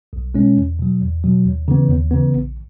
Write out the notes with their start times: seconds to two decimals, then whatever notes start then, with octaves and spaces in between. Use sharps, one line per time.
0.13 B1
0.34 B2 G#3 C#4
0.57 E2
0.79 B2 F#3
1.00 E2
1.24 B2 F#3
1.45 D#2
1.68 C#3 E3 B3
1.89 D#2
2.11 C#3 E3 B3
2.33 A#1